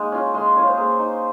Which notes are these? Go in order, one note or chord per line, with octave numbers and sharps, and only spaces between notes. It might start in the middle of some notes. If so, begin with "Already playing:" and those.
Already playing: G#3 A#3 D#4
C#4 F4
G#3 C6
C#4 F4 C#5
C5
A#3 G#4
D#4